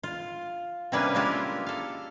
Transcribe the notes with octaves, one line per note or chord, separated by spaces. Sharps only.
F4
C3 G3 A#3 C#4 D4 B4
G#3 A#3 E4 F4 G4
A4 F5